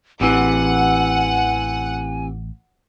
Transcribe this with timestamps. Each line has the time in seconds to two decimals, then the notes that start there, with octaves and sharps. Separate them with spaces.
0.21 A1 C3 E3 F#5 G#5